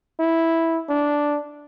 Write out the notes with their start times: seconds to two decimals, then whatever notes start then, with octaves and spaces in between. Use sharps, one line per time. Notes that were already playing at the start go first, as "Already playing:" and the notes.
0.20 E4
0.89 D4